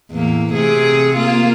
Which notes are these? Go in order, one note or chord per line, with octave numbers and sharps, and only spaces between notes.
E2 A2 A#3
C3 A3 G#4
A#3 F4